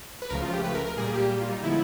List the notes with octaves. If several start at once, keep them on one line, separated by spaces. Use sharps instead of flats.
B4
C#2 C#3 F3 A3 A#4
F4
G4
B4
A#4
A#4
A#2 G3 A#3 G#4
G4
F4
D#4
D3 F3 G#3 B3 E4